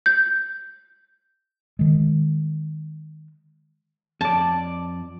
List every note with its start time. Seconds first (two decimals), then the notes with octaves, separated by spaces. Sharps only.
0.06 G6
1.79 D#3 G#3
4.21 F2 D5 A5